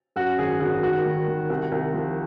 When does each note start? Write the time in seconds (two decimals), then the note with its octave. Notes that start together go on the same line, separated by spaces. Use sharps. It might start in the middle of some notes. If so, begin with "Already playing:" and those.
0.16 F#2 F#4
0.38 G#1 G#4
0.60 G#1 F#4
0.83 D#3 F#4
1.06 D#3
1.28 D#3
1.50 C2
1.72 C2
1.94 F3